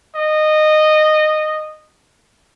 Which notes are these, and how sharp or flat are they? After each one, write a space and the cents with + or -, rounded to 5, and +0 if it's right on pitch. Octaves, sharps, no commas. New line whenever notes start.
D#5 -15